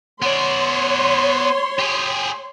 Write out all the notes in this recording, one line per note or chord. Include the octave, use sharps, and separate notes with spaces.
B3 C#5 D5 C6
G4 G#4